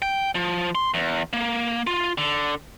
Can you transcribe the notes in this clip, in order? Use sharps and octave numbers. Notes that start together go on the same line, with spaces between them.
G5
F3
C6
E2
A#3
F4
D3